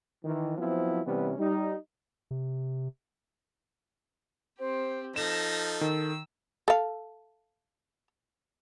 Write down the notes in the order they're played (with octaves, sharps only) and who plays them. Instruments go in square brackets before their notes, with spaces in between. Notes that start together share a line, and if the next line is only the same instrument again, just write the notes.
[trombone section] D#3 E3
F3 F#3 B3 C4 E4
C3 E3 G3 B3 C#4
G3 D#4
[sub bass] C3
[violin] C4 G4 [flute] C5
[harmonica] F3 D#4 [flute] A4 [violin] A#6 B6 [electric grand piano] E7
[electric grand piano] D#3 [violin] E6
[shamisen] A4 F5